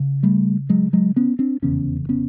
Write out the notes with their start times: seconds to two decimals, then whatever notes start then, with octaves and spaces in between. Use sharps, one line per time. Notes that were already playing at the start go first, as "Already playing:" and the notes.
Already playing: C#3
0.23 G3 A3
0.70 F#3 G#3
0.93 F#3 G#3
1.16 B3 C#4
1.39 C4 D4
1.62 F1 E2 C#3 B3 C#4
2.09 B3 C#4